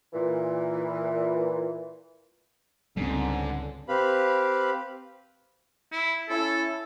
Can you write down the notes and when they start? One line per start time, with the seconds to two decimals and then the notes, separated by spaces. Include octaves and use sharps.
0.13 A#2 E3
2.97 C#2 G#2 D3 G3 G#3 C4
3.88 C4 G4 B4 F5 B5
5.92 E4
6.29 C#4 E4 A4